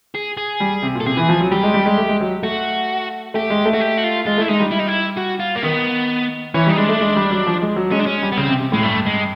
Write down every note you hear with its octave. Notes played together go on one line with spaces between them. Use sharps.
G#4
G#4
G3
C3
A#2
A4
C3 G#4
E3
F3
F#3
G3 G4
G#3
G3
G#3
A3
G#3
F#3
A3 F#4
A3 G4
G#3
A3
F#4
G4
F#4
F4
G#3 F4
A3 E4
G#3 D#4
G3
E4
D#4
E4
F#4
F4
A#3
D#3 B3
E3 C#4
G3 D#4
G#3 D4
A3
G#3
G3
F#3
F3
G#3
F#3
G#3 C#4
D4
G#3 C#4
G3
B3
C#3 C4
C3
C3
A2 G#3
G2 A3
G#3